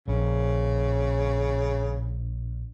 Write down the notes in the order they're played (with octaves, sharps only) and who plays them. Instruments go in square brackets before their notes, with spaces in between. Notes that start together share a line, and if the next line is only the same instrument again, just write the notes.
[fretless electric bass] A#1 [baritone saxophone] C#3